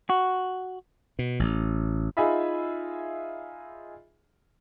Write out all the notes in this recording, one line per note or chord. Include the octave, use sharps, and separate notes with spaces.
F#4
B2
A1
D#4 F4 G#4 E5 G#5 B5